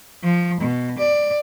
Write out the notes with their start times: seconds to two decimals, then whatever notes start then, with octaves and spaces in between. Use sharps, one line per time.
0.24 F3
0.60 B2
0.98 D5